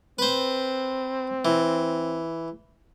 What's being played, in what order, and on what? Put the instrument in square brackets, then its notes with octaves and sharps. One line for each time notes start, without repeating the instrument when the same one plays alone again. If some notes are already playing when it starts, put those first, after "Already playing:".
[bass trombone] C4 [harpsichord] B4 C5
[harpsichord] E3